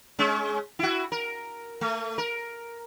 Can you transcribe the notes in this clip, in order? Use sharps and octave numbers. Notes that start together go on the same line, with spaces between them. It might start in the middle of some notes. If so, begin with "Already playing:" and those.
G#3 C#4
E4 F#4
A#4
A3
A#4